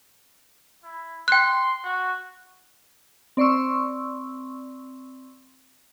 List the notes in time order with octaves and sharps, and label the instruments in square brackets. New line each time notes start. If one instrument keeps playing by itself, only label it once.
[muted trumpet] E4
[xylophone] G5 F#6 [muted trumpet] C6
[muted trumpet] F#4
[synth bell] C4 D5 C6 C#6 E6